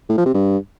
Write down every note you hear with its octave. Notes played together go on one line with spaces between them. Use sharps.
A2
F3
C3
G2